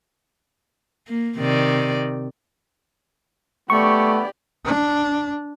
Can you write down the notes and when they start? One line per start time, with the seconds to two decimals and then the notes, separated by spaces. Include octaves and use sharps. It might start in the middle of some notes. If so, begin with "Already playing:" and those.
1.08 A#3
1.37 C3 D#3 D5
3.70 A3 B3 G4 D5 C#6
4.65 D4